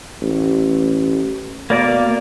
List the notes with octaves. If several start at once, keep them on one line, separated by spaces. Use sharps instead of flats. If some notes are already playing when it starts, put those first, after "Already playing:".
A1
B2 A#3 D5 D6